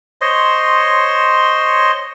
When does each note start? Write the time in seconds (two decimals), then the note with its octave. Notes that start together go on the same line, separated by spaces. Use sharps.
0.21 C5 C#5 D#5 C6